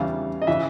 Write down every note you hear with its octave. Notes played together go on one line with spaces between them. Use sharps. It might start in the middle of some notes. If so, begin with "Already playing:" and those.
Already playing: E2 C#3 E3 G3 F5
D#5
C#3 E3 E5